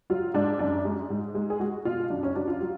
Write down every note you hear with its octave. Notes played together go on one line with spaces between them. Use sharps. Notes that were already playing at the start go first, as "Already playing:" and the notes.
F#3 F4
G#2 D4
F#2 D4
G#3
G#2
G#3
G#4
G#3 F#4
B2 F4
F#2 D4
C#4
F#3 D4
F4
F#3